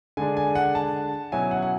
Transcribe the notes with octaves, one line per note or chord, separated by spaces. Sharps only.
D3 G#3 D4 G#5
G#5
F#5
A5
B2 F#3 C#4 E4 G#5
F#5
F#5